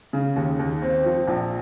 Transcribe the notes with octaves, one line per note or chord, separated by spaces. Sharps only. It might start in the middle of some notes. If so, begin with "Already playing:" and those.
C#3
D#2
D#2
C4
F3
A#1